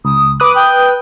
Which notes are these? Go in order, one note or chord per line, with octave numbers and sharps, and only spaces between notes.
C#2 D#6
B4 D6 D#6 F#6
G5